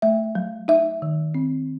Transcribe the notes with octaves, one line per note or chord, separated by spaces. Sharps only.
A3 E5
F#3
D#4 E5
D#3
C4